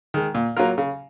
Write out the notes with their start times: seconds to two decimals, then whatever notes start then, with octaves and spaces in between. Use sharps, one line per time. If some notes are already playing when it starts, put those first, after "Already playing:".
0.14 D#3 G#3
0.35 A#2
0.57 F#3 A#3 F4 A#4
0.78 C#3